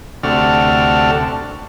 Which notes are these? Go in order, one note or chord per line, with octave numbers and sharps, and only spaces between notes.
D2 C3 D4 F#4 A4 F6